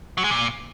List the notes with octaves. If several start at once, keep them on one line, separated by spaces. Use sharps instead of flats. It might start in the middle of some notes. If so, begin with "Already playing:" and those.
F#3
G#3
A#2